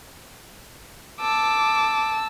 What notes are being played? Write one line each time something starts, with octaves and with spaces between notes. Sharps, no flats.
A5 D6 E6